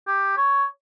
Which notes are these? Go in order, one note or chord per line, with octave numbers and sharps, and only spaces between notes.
G4
C#5